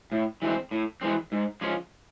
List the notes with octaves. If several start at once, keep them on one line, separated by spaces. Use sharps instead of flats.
A2
E3 G#3 C4
A2
E3 G#3 C4
G#2
F3 G#3 C#4 F4